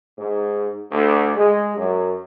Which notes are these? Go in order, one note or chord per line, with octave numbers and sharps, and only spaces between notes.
G#2
D2
G#3
F#2